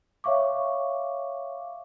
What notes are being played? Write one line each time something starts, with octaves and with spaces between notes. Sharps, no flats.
C#5 E5 F5 C#6 D6